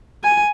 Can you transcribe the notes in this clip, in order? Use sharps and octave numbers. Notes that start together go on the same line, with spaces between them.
G#5